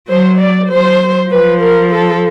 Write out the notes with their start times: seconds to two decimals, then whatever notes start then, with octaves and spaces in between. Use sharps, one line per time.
0.08 F#3 C5
0.39 D5
0.69 F#3 C5
1.30 F3 B4
1.60 A#4
1.91 A4